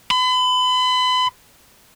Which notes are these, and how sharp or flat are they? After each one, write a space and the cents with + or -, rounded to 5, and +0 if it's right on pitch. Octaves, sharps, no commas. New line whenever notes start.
B5 +35